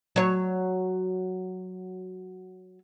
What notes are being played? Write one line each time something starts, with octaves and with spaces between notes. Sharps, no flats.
F#3 C#5